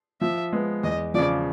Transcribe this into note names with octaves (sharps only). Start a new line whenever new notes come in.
F3 E5
G#3 B3
E2 D#5
C#3 F3 D5